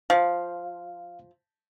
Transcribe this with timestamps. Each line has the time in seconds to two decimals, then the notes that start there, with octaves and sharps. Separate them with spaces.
0.10 F3 F5